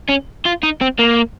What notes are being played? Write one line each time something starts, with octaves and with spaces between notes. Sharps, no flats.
C#4
F4
D#4
C4
A#3